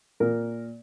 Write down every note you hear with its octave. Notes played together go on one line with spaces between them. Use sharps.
A#2 A#4